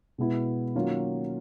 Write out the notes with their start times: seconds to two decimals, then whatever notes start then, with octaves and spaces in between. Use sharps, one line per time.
0.18 B2 G#3 B3 E4
0.75 D#3 F#3 A#3 C#4 F4